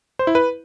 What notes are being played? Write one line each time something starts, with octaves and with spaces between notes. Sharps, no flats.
C5
E4
B4